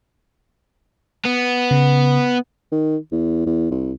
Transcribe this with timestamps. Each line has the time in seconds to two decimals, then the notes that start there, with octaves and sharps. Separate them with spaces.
1.25 B3
1.71 C#3
2.72 D#3
3.12 E2
3.46 E2
3.71 C2